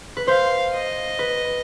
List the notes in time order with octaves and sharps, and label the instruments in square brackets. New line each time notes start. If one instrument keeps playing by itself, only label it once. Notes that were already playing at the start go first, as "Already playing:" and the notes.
[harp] B4
[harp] C5 [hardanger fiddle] F5
[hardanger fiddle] D#5
[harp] B4